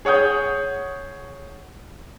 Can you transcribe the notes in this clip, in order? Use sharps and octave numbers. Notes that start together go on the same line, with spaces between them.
G#4 C#5 F#5 D#6 G6